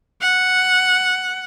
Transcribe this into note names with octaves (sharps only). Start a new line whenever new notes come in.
F#5